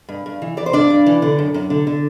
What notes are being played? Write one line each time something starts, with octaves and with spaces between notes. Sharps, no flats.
G2
G2
E3
E3 D5
C5
G2 D4 D5
G2
E3
D3
F#2
F#2
D3
D3